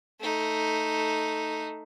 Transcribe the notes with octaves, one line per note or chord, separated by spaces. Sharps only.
A3 D#4